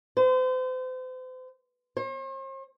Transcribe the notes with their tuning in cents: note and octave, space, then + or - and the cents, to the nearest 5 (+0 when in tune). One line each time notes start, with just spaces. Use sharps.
C5 -40
C5 +45